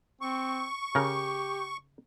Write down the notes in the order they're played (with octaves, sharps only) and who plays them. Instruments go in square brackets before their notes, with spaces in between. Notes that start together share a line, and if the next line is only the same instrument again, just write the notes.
[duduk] C4 [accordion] C#6
[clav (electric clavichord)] C#3 A#4 [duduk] G4